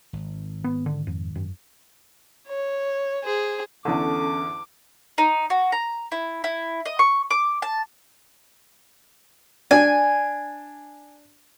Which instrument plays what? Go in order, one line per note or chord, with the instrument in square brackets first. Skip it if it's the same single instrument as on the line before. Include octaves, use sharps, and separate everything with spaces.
[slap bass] G#1
[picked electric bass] B3
D3
F2
F#2
[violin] C#5
G#4 C5
[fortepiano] E2 D3 [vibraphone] C#4 A4 A5 [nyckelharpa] D6
[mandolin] D#4
F#4
A#5
E4
E4
D#5
C#6
D6
A5
[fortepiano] D4 [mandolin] G#5